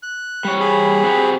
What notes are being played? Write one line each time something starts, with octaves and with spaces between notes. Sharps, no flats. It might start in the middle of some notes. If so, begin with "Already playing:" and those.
F#6
G3 C#5
G#4 B5
C4 F#4 G4